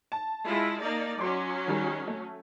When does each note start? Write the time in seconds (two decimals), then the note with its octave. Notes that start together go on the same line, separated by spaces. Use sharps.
0.12 A5
0.46 G#3 E4 F4
0.81 A#3 D#4 D5
1.18 F#3 C#4 C6 D6
1.68 D#3 G3 G#4
2.07 A3